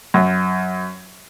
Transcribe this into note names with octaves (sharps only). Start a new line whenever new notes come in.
F#2